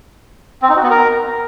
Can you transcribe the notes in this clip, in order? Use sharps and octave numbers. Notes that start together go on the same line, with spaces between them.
C4
D#4
F#4
B3
A#4